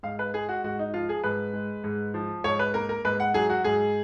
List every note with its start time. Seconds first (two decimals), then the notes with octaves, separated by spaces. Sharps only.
0.03 G#2 F5
0.19 B4
0.34 G#3 G#4
0.49 F#4
0.64 G#2 F#4
0.79 D#4
0.93 F3 F4
1.09 G#4
1.23 G#2 B4
1.53 G#3
1.84 G#2
2.14 F3
2.44 G#2 C#5
2.59 B4
2.74 A#3 A#4
2.89 A#4
3.05 G#2 B4
3.20 F#5
3.34 F#3 G#4
3.49 F#4
3.64 G#2 G#4